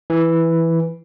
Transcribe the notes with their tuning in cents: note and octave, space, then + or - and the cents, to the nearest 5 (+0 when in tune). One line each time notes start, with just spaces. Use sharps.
E3 +0